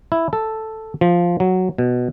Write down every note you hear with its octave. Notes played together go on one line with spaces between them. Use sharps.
E4
A4
F3
F#3
B2